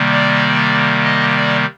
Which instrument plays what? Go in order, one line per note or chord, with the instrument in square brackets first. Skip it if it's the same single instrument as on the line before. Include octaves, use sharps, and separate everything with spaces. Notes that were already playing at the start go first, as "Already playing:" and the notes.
Already playing: [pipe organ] C3 D#3 G3 A#3
D5
D#5
D5